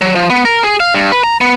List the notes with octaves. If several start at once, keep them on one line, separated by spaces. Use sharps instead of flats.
F#3
F3
B3
A#4
G#4
F5
G2
B4
A#5
B3